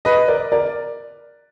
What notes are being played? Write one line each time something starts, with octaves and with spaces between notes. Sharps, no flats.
B4 D#5
A#4 D5
A#4 D5